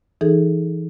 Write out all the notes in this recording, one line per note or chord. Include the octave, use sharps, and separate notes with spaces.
E3 D#4 G#4 A4